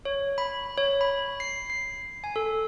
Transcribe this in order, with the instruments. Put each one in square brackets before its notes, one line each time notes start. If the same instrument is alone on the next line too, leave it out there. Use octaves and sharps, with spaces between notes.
[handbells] C#5
B5
C#5
B5
C7
C7
G#5
A4